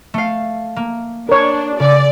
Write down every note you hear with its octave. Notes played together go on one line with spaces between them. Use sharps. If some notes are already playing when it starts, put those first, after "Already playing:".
A3 F5
A#3
D4 A#4 C#5
C#3 D5